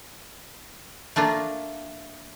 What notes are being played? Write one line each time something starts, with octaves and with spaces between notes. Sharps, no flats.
A3 A#3 D4 F4